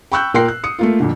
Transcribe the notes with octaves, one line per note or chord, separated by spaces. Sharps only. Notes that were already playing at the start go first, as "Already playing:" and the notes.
G5 B5 C#6 E6 F#6 G6
A#2 A#4 G5 C6 F#6 C7
F#6
D#6 C#7
A3 A#3 F4
F2 A#2 D3